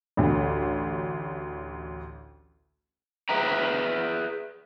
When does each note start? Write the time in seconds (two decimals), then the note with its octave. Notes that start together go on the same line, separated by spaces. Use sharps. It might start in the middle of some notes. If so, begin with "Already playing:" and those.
0.17 A1 D2
3.29 G#4 B4 E5 G5 A#5